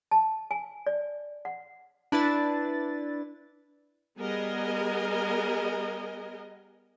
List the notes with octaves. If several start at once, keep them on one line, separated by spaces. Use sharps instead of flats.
A5
G#5
D5
F#5
D4 E4 B4 A6
G3 B3 G#4 A#4 D#5 G#5